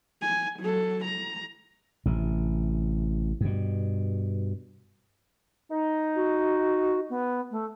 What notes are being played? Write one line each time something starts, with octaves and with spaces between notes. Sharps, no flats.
G#5
F#3 A4
A#5
A1 C3
G2 B2
D#4
F#4
B3
A3